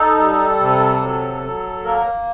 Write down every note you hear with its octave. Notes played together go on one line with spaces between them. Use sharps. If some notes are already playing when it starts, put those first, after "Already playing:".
Already playing: D#4 A4
G3
C3
F#3
F#3
A#3 A#4